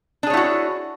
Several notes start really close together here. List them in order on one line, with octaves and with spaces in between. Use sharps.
D4 G#4 C#5 E4 F#4